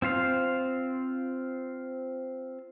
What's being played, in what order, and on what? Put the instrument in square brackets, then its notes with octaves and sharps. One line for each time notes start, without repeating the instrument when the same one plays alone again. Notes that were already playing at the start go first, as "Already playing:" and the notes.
[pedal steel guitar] C4 F4 C5 F5